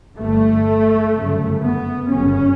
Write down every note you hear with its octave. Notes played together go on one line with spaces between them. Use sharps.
G1 G2 A3
G1 F#2 C#3
B3
G1 F#2 C#3 C#4